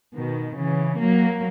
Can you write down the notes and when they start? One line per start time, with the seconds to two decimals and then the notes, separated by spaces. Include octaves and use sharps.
0.15 B2 D#3
0.58 C#3 E3
1.01 F#3 A#3